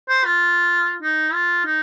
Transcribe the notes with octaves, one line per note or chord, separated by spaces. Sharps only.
C5
F4
D#4
F4
D#4